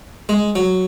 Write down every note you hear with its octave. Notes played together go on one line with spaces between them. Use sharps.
G#3
F#3